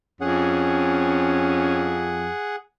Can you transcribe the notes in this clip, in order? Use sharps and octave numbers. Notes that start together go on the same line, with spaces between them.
F2 C#4 G#4 F#5